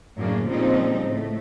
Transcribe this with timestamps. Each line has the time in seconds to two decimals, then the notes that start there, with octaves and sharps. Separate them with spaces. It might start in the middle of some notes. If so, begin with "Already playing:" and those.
0.18 F#2 A2 C#3 A#3 C#4 D4
0.48 A#2 C#3 F3 G3 C4 D#4
1.04 A2 A3